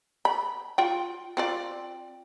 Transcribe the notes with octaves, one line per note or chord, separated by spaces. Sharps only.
B5
F4 G5
C4 F4 D5